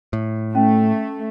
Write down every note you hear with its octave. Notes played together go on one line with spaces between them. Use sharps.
A2
A3 C#4